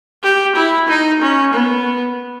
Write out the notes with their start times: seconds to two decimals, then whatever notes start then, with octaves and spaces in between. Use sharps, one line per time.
0.23 G4
0.56 E4
0.88 D#4
1.21 C#4
1.54 B3